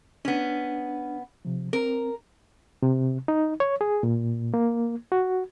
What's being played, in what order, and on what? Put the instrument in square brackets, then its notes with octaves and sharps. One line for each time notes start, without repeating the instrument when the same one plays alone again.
[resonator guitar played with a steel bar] B3 C#4 [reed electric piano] D4
[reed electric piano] C3 F3
[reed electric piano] C4 [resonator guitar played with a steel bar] A#4
[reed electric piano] C3
D#4
C#5
G#4
A#2
A#3
F#4